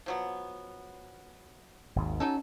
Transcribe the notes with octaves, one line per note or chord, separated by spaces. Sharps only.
F3 F#3 B3
G#1 D#2 G#2
F#3 C#4 D#4 A4